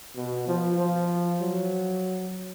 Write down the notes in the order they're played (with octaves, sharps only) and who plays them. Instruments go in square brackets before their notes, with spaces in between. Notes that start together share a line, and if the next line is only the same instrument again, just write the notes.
[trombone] B2
F3
F3
F#3